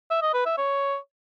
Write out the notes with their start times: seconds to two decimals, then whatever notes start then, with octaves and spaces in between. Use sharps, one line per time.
0.10 E5
0.22 D#5
0.34 B4
0.46 E5
0.57 C#5